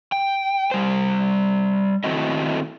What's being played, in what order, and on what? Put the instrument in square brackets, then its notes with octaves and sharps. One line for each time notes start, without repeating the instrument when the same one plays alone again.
[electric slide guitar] G5
G3 C5
D#3 A3 C4 E4 F#4 D#5